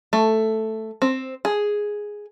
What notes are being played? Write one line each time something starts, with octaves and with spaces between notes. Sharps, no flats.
A3
C4
G#4